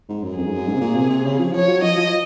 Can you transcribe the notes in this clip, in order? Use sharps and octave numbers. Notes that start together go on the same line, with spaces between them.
G#2
F#2
F2 G#4
G#2
F#2
G#2
C3
A#2
C3
C3
C#3
F3
F3 C#5
F#3
F3 D#5
F3